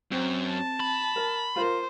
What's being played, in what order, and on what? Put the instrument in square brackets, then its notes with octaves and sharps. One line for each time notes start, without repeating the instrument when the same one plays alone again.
[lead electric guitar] F#2 [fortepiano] C4
[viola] A5
[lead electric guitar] B5
[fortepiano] A#4
[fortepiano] F4 A#4 [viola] C5